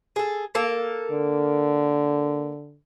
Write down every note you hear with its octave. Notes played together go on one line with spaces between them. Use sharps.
G#4 A4
A#3 A4
D3